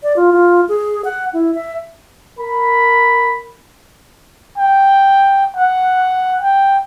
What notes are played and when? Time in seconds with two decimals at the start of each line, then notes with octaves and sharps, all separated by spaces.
0.03 D5
0.16 F4
0.33 F4
0.69 G#4
1.05 F#5
1.33 E4
1.55 E5
2.39 A#4 B5
4.58 G5
5.56 F#5
6.41 G5